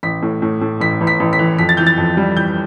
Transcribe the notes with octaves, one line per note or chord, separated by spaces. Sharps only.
A1 B6
A2
A2
A2
A1 B6
A1
B6
A1
B6
E3
F2 B6
A6
E3 G6
A6
F2
G3
E3 G6